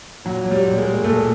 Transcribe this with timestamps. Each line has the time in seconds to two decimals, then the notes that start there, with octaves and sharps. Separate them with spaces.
0.25 A#2 F#3
0.44 F#3
0.51 G3
0.65 A#2
0.78 G#3
0.85 A#3
1.04 A#2 A3